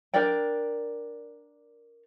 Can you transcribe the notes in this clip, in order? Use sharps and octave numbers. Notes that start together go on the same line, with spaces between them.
D4 A#4 D5 G5